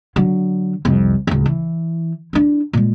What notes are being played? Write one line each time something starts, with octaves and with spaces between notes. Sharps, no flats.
D3 F#3
C2 F2
D1 C#2
E3
D4 E4
A#2 G#3